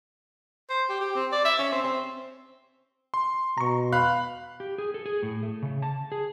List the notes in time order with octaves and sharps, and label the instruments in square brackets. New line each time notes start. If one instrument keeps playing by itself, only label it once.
[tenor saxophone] C5
G4
G4
C4
D5
E5
C#4
C4
C4
[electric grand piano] C6
[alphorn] B2 [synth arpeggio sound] A#5 C#6
[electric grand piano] F5 [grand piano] B5 F#6
[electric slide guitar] G4
G#4
A4
G#4
A2
A3
C#3
A5
G#4